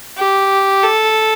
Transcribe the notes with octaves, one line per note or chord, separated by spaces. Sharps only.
G4
A4